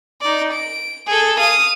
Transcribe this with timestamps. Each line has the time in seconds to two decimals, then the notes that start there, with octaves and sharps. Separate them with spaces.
0.22 D#4 D5
0.53 D7
1.07 G#4 A4
1.39 F5 D#6